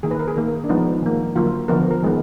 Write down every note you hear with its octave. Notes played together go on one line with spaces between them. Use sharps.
D#3 A#3 G#4
B4
A#4
G#4
D#3 A#3 A#4
D4
F3 G#3 B3 D#4
D#3 A#3
D3 F#3 A#3 F4
D3 F3 B3 A#4
A#4
D#3 G#3 B3